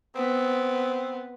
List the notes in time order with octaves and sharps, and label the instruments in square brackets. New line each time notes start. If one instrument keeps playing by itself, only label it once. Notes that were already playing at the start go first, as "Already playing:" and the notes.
[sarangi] B3 [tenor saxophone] C4